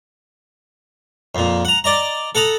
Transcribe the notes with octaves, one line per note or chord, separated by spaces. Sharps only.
F2 A#2
F#5 A#5
D5 D#5 A#5
A4 F#5 A#5 D#6